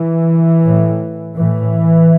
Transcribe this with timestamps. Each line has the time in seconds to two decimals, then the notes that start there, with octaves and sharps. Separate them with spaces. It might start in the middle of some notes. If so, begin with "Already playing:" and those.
Already playing: E3
0.64 A2
1.37 A2 E3